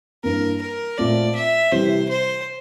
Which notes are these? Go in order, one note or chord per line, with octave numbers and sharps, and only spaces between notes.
G2 E3 A#3 A#4
A#4
A#2 A3 C4 F4 D5
E5
C3 E3 G3 C4 G4 C5
C5